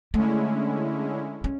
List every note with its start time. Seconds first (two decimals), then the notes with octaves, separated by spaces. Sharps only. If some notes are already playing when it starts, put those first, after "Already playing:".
0.14 D3 G#3 A3 C#4 E4
1.44 C#4